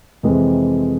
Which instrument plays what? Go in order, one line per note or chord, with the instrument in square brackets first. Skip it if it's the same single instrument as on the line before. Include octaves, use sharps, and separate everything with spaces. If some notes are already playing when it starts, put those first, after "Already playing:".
[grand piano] F2 C3 E3 G#3 C4